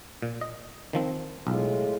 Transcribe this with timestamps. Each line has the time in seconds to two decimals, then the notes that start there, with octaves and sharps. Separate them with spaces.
0.22 A#2
0.41 D#5
0.93 D#3 F3 C4
1.47 B1 A2 G#3 F4